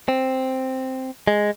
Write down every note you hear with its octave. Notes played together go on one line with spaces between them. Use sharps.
C4
G#3